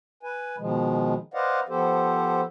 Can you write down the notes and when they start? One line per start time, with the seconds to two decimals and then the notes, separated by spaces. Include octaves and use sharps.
0.23 B4 G#5
0.58 B2 D#3 F3 G#3
1.34 B4 C5 D5 D#5 F5 F#5
1.69 F3 B3 G4 A4 C5